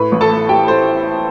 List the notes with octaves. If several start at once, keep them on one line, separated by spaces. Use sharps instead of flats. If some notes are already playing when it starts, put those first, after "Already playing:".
Already playing: A2 B4 B5
A1
A4 A5
A3
A3 G4 G5
A3 C5